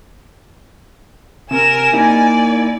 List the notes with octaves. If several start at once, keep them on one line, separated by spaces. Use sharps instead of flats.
C3 A#4 G#5 E7
A#3 D#4 E4 D5